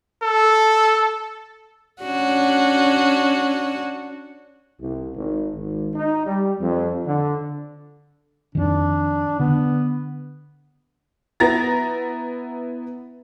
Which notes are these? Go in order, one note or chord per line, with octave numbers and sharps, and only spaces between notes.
A4
C#4 D4 F#4
C2
G#1
G#1
D#4
G3
F2
D3
F2 D#3 D4
D3 B3
B3 E4 A#5 A6 A#6